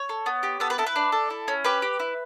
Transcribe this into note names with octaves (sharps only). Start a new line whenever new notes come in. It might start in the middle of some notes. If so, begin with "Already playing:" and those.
Already playing: C#5
A4
B3
G4
B3 A4
B4
E4 A4
B4
D4
A4
E4
C#4
G4 B4
G4
E4